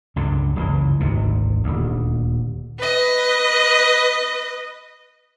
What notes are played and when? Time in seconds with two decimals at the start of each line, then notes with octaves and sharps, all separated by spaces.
0.16 C#2 G2 D3
0.56 F#1 C#2 B2 E3
1.00 G#1 D2 C3
1.64 D#1 D2
2.78 B4 D#5